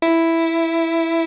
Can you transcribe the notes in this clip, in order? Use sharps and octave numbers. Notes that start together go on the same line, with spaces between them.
E4